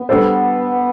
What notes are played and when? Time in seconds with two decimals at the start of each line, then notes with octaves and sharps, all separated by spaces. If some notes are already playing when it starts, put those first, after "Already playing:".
Already playing: B3
0.09 G3 D4 A4 C5